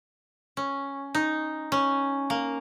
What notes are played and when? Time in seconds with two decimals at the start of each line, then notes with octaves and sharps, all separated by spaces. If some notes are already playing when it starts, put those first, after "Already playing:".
0.57 C#4
1.15 D#4
1.72 C#4
2.30 A#3